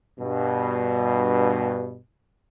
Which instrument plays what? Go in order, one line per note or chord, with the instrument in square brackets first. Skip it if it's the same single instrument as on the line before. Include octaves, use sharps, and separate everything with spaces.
[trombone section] G2 B2